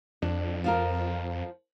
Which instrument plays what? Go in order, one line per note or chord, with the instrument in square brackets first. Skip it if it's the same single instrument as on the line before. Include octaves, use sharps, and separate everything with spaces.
[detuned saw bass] F2 [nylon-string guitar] D4
[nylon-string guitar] F3 F4 A#4